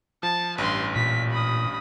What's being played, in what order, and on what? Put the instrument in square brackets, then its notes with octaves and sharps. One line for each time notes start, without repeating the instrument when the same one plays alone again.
[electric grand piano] F3 [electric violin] A5
[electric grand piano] A1 G2 [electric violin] B4 C6
[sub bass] A#2 [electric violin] B6
[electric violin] B5 D#6